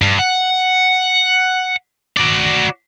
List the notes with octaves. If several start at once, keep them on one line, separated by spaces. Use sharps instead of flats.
G2
F#5
F#4 D5